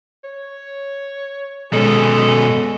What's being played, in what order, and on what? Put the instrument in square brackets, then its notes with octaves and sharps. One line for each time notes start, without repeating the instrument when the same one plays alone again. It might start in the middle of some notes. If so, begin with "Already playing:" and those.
[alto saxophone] C#5
[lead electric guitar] B2 C#4 [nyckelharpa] G#3 [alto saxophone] A4